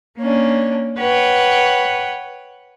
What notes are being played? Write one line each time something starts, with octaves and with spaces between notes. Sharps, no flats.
A#3 C#4 D4
B4 C#5 F#5 G5